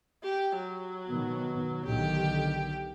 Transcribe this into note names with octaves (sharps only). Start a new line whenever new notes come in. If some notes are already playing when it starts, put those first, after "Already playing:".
G4
F#3
B2 D#3 B3
B1 D3 D#3 G4